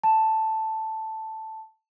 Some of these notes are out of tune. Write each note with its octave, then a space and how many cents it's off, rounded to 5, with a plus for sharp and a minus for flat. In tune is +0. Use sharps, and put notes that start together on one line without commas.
A5 +0